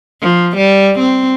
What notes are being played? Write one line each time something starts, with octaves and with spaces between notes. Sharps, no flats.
F3
G3
C4